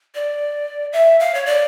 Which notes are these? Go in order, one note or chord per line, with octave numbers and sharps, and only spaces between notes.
D5
E5
F5
C#5
D5